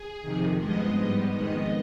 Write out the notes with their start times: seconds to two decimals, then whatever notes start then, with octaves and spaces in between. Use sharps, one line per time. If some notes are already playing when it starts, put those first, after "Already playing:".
Already playing: G#4
0.22 F2 C3 D#3
0.59 G2 F3 G#3 B3 D#5
0.95 G#2 G3 B3
1.31 F2 D#3 G#3 B3 D#5